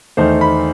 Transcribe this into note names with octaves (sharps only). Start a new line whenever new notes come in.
E2 D#3 A3 D#4 C5
B5